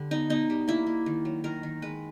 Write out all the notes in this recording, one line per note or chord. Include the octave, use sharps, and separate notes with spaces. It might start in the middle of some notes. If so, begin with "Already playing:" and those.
Already playing: D3 G3
B3 D#4
B2 D#4
G3
A#3 E4
A#3
D#3
F#3
D#3 A#4
D#3
G#3 B4